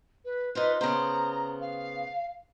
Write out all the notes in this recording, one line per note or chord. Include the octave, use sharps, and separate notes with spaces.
B4
D#4 F4 B4 C5
C#3 B3 C5 A#5
F5